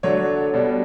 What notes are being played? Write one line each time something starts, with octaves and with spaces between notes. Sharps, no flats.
D3 F#3 A3 D4 C#5
B2 G3 D4